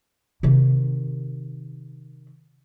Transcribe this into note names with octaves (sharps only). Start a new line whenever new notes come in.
C3 D#3